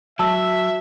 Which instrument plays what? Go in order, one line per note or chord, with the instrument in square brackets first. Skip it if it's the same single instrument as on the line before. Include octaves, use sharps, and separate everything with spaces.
[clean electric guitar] F#3 [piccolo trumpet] E5 [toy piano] A5 E6